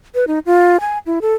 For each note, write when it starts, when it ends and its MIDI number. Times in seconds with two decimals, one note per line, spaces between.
0.15 0.25 71
0.28 0.39 63
0.46 0.80 65
0.81 0.98 80
1.06 1.19 64
1.22 1.34 69